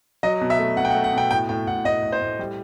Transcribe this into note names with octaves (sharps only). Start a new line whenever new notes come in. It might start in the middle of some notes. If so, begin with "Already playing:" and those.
F#3 D#5
B2
E5
A3
B2 F#5
G5
F#5
A3
F#5
B2 G5
A2 G5
A2 G5
A2 F#5
A2 D#5
A2
C5
A2
G3